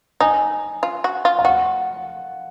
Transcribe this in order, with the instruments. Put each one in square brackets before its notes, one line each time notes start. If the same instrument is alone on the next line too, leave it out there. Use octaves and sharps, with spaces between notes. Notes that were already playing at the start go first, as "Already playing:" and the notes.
[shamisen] D#4 [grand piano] G#5
[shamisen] F4
F#4
F4
[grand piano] F5
[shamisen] F#4 [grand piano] F#5